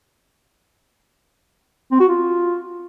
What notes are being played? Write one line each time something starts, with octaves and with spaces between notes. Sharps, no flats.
C4
F#4
F4